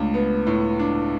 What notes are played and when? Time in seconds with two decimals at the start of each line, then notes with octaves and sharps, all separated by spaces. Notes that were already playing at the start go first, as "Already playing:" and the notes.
Already playing: C#2 A3 D4
0.14 B3
0.47 A2
0.79 D4